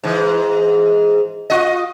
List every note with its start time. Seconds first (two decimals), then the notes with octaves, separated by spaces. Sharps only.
0.04 G#2 E3
1.50 F4 D#5